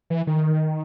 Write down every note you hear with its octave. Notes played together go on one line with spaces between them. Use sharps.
E3
D#3